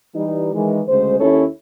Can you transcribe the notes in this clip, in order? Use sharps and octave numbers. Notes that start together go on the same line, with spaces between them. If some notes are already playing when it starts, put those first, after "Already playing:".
E3 G3 D#4
D#3 E3 G#3
D2 C#3 G#3 C5
D#2 C#4 E4 A4 C#5